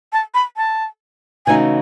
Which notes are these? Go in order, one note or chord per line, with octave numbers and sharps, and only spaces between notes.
A5
B5
A5
C#3 E3 A3 D#4 F#4 G#5